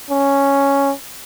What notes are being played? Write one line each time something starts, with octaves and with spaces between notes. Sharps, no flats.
C#4